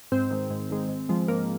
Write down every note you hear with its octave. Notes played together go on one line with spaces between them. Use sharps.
G#2 C4
D#3 G#3
G#2
D#3 G#3
G#2
F3 G#3
G#2 A#3